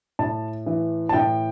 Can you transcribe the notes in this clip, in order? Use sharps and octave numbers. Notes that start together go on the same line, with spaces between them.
A2 A5
E3
A5
A2 G5